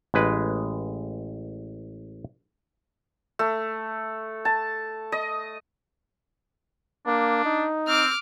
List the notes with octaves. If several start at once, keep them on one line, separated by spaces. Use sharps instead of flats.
A1 G#3 B4
A3
A5
D#5
A#3 D4
D#4
C4 D6 F6